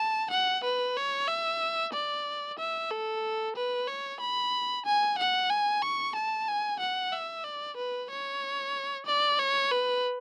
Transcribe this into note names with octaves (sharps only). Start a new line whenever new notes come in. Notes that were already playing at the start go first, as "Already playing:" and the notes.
Already playing: A5
F#5
B4
C#5
E5
D5
E5
A4
B4
C#5
B5
G#5
F#5
G#5
C#6
A5
G#5
F#5
E5
D5
B4
C#5
D5
C#5
B4